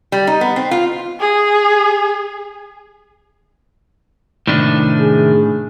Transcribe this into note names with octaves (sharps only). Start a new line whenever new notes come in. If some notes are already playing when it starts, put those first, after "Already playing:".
G3
D#4
B3
C4
F4
G#4
A2 C3 D#3 D4
G#4